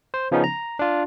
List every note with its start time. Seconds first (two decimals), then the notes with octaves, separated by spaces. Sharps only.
0.14 C5
0.32 C#3 F3 B3 C#4 D#4
0.44 A#5
0.79 D4 F4